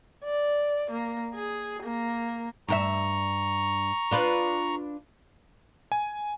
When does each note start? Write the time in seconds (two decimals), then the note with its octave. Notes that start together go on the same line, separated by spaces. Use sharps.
0.25 D5
0.92 A#3
1.35 G#4
1.83 A#3
2.68 G2 A#4 E5 A#5 C#6
4.11 D4 F4 B4
5.92 G#5